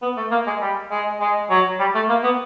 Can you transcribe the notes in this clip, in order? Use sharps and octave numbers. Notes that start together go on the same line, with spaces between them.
B3
A3
A#3
G#3
G3
G#3
G#3
F#3
G3
A3
A#3
B3